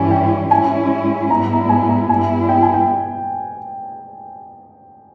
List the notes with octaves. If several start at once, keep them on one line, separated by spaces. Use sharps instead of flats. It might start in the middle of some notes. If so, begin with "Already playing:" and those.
Already playing: G2 E3 G3 C#4 E4 G#5
G5
G#2 G3 C#4 E4 G#5
G#2 G3 B3 E4 A#5
A#5
G#5
A#5
G2 G3 B3 E4 G#5
G5
G#5
G5